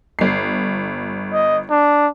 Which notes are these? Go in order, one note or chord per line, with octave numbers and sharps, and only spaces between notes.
G1 C7
D#5
D4